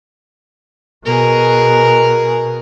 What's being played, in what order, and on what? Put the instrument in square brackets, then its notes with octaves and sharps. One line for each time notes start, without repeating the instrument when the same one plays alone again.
[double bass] B2 [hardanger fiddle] G#4 A#4